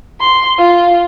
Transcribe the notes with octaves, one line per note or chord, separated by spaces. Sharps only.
C6
F4